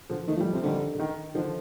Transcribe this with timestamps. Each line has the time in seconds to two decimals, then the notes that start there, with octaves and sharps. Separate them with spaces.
0.10 D3 F3
0.28 D#3 A3
0.37 F3
0.41 G3
0.53 C3 F3
0.63 D3 D#3 G3
0.95 D3
1.00 D#3
1.34 D3 D#3 F3